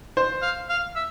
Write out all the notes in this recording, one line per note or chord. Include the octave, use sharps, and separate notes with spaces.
C5
F5
F5
E5